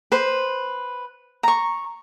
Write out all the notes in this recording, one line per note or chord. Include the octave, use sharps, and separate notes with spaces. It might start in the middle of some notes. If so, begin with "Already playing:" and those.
B4 C5
A#5 C#6